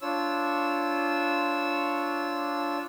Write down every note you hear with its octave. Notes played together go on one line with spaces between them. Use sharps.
D4 F4 C#5 E6